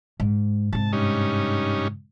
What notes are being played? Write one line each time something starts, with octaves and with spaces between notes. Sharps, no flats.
G#2
G#2 C3 A5
G2 C#4 D#4